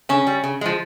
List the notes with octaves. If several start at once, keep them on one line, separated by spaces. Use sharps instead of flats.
C#3 C#4
G3
C#3
F3 G#3